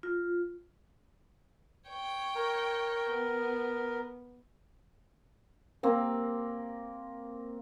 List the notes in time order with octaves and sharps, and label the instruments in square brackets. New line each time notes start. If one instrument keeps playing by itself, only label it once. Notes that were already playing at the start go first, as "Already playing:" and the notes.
[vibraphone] F4
[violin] C#5 G5
[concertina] A#4
[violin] B3
[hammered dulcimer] A#3 C4 A#4